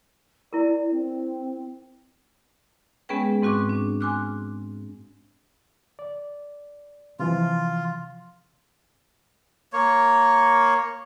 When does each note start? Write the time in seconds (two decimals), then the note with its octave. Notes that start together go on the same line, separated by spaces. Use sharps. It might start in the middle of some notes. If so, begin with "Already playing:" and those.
0.53 E4 A#4 D5
0.91 C4
3.09 G#3 B3 C#4 G#4 B4 G5
3.42 G#2 C4 F#4 C#6 D6
3.69 D4
4.00 G#5 C6 D6 F6 F#6
5.99 D5
7.19 C3 E3 F3 F4
9.73 A#3 C#5